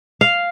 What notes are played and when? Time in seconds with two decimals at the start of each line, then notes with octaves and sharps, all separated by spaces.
0.21 F5